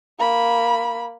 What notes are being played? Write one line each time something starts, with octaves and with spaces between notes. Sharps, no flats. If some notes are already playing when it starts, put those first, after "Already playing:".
A#3 B5